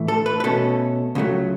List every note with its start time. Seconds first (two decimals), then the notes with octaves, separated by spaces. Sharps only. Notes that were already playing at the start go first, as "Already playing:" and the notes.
Already playing: A2 E3 A3
0.08 A4
0.26 B4
0.40 B4
0.44 B2 A3 C#4 A4
1.15 C#2 C#3 F#3 A3